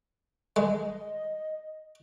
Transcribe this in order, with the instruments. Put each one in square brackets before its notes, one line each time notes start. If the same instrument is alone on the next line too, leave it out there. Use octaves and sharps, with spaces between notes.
[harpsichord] G#3 [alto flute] D#5